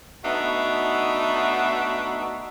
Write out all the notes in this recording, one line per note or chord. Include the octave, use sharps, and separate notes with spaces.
A3 B3 D4 D#4 F#4 E5